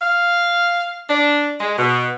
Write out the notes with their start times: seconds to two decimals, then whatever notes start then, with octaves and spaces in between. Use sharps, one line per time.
0.01 F5
1.08 D4
1.60 G#3
1.78 B2